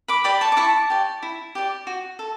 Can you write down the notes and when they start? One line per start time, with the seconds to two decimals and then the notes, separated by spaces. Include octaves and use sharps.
0.08 B5 D6
0.24 G4 D5 B5 D6
0.41 A5 C#6
0.52 D6
0.57 E4 A5 C#6
0.90 G4 D5
1.23 E4
1.55 G4 D5
1.87 F#4
2.19 A4